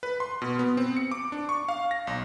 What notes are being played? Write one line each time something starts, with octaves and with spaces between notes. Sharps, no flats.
B4
C6
B2
B3
C4
C#7
D6
D4
C#6
F5
A#6
B1